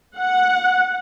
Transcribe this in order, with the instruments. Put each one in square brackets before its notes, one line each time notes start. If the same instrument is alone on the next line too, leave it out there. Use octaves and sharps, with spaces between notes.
[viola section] F#5